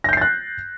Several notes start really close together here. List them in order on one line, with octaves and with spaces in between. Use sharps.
A#6 G6 C7 A6 F#6